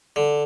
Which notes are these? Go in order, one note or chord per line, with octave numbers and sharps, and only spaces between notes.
D3